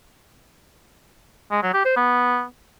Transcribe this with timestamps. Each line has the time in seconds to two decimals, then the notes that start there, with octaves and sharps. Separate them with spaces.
1.51 G#3
1.63 F#3
1.74 G4
1.85 C5
1.96 B3